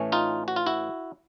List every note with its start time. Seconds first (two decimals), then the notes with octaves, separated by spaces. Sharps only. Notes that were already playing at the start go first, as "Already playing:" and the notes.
Already playing: A2 E3 A3 C#4
0.12 D#4 F4
0.48 F#4
0.56 F4
0.67 E4 F#4